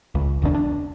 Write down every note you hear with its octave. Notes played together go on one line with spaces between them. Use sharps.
C#2
E1 C#2 D#3 D4
D4